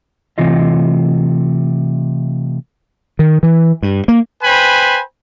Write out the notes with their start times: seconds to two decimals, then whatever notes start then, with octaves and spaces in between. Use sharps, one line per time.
0.38 C3 E3 A3 F4 D#5
3.19 D#3
3.43 E3
3.83 G2
4.08 A#3
4.43 B4 C5 G5 G#5 B5